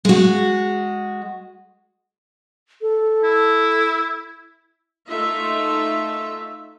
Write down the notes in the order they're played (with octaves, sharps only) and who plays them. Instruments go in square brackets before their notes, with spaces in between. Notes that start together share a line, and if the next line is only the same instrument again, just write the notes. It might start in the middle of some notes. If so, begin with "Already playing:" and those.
[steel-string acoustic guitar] G#3 F#4
[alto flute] A4
[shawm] E4
[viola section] A3 D#4 F4 E5